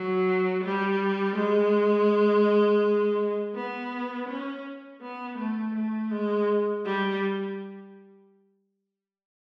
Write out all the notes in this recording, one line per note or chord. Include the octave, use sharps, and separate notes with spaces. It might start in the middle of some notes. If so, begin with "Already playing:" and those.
Already playing: F#3
G3
G#3
B3
C#4
B3
A3
A3
G#3
G3